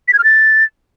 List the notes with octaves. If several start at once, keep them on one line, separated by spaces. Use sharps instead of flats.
B6
G#6
F6
A6